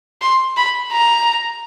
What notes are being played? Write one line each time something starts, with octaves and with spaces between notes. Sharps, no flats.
C6
B5
A#5